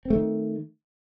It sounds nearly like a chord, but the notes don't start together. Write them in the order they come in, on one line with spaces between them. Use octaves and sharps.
C4 A3 D#3